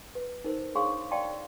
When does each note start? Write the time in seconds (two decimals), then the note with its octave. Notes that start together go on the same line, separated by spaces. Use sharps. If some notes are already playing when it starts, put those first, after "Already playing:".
0.15 B4
0.44 D#4 A#4 C5
0.75 D4 G#4 C#5 F5 C6 C#6
1.11 D5 F5 G5 A5 C6